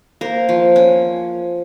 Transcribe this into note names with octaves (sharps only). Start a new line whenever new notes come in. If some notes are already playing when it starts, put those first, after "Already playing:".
A#3 A#4 C5
F3
C#4